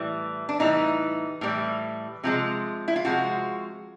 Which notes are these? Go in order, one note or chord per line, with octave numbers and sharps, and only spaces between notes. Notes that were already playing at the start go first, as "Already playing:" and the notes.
Already playing: A2 E3 G3
D4
A2 E3 G3 D#4
A2 E3 G3
C3 F3 G#3
E4
F4
C3 F3 G#3 F#4